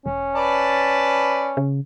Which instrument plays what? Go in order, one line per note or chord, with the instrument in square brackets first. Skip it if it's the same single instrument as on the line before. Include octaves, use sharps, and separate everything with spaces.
[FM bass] E1 [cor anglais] C#4
[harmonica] B4 D5 A5
[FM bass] C#3